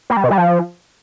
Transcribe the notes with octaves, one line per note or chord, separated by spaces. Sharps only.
A#3
G3
B2
G3
F3